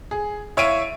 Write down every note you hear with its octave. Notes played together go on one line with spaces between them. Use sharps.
G#4
E4 C#5 E5 F5 D7 D#7